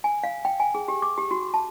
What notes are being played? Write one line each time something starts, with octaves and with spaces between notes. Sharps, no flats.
G#5
F5
G5
G#5
G#4
G4
D6
G4
F#4
A5